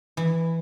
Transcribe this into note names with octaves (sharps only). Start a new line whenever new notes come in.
E3